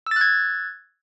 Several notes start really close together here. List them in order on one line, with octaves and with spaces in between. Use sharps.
E6 A6 F#6 G#6